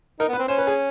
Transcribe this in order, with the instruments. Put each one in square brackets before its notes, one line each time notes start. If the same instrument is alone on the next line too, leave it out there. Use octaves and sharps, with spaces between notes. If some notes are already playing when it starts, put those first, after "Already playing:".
[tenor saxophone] D#4 [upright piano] A#4
[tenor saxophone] B3
[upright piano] B4
[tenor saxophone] C4
[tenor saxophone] C#4 [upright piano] C5
[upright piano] B4
G#4